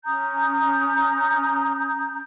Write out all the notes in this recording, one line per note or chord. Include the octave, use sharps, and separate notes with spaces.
C#4 A#5 D#6 G6